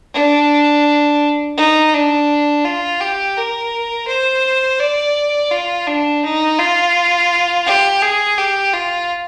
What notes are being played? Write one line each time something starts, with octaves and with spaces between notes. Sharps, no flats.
D4
D#4
D4
F4
G4
A#4
C5
D5
F4
D4
D#4
F4
G4
G#4
G4
F4